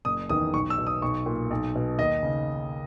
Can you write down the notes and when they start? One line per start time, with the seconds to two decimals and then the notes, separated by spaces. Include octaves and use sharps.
0.05 F#1 D#6
0.29 E2 D#3 D#6
0.54 B1 C#6
0.70 E6
0.78 B2
0.87 D#6
1.02 B1 C#6
1.26 A#2
1.51 B1
1.75 B2
1.99 D#2 D#5
2.23 C#3